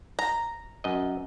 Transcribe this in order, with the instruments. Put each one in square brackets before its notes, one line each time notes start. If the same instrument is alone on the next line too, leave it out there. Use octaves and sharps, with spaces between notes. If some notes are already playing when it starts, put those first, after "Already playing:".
[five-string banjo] A#5
[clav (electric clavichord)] F#2 D#5